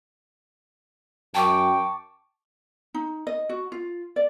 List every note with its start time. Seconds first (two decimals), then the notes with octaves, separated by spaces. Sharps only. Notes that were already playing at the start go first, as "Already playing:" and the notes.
1.35 F#2 G5 A5 C#6 D6
2.94 D#4
3.27 D#5
3.49 F#4
3.72 F4
4.16 D5